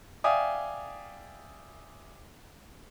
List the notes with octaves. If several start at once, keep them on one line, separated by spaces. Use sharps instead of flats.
D5 E5 F5 G5 G#5 D#6